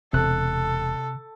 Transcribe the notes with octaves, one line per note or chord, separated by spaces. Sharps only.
E1 C3 A4 F#6